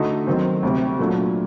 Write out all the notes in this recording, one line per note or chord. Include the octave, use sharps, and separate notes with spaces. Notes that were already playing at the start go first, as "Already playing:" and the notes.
Already playing: D3 A3 D#4 F#4
D#3 F#3 C4
D2 C3 G3
A#2 F#3 A3 D4 F#4